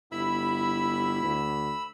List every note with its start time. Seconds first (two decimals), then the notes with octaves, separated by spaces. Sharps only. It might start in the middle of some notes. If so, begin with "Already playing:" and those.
0.12 G1 E4 E5 B5 E6
1.23 D2